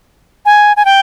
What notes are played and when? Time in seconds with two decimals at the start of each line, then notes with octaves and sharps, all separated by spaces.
0.46 G#5
0.77 G#5
0.85 G5